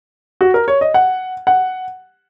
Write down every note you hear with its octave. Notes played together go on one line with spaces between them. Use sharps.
F#4
A#4
C#5
D#5
F#5
F#5